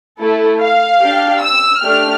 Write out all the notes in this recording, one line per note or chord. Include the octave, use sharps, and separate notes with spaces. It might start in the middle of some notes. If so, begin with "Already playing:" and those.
A3 E4 A4
F5
D4 G4
E6
A3 D4 G4 F6